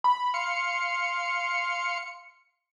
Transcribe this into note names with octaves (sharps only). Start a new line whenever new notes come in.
B5
F5 C6 C#7